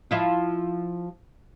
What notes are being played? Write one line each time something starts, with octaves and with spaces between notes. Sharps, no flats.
F3 E4 F4